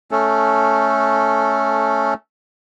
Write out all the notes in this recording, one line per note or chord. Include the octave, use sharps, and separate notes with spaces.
A3 C#4 A4